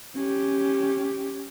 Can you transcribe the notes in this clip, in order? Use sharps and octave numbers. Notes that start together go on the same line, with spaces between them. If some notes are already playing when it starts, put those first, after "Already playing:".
C#4 G4